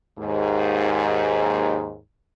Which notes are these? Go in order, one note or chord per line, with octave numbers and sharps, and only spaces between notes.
D#2 G#2